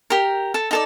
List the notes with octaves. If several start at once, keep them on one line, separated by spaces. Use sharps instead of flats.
G4 A#4
A4
D#4 A4 D5